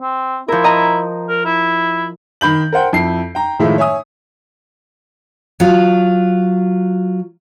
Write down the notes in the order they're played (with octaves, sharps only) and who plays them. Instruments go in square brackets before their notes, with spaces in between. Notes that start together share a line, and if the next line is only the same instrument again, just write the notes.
[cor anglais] C4
[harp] F3 A#4 [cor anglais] E4
[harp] D#5 A#5
[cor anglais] A#4
E4
[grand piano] D#3 B5 G6 F#7
A#4 C5 F#5 G5
F2 E4 C7
G5 A#5
A2 D#3 F3 G#3 A3 E4
C#5 E5 G#5 D#6
[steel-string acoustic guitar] F#3 F4